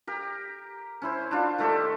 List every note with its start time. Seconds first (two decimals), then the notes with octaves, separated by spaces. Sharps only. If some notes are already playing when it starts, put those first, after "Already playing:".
0.07 G4 A#4
1.02 C#4 E4 C5
1.31 D4 F4
1.58 D#3 A3 G4 A4